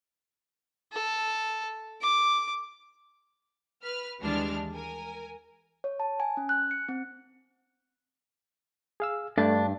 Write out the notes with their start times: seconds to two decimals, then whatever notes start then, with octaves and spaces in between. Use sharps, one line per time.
0.93 A4
2.01 D6
3.85 B4 F6
4.20 D#2 E3 G3 G#3 D4 F6
4.74 A#4 G#5
5.84 C#5
6.00 A5
6.20 G#5
6.37 C#4
6.49 F#6
6.71 C#7
6.89 C4
9.00 G#4 F5 E6
9.38 G2 A3 D4 A6